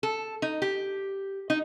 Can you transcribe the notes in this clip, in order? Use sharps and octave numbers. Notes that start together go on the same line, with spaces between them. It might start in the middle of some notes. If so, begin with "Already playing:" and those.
A4
D#4
G4
D#4